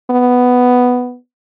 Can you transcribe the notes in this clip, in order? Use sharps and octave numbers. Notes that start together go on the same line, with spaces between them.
B3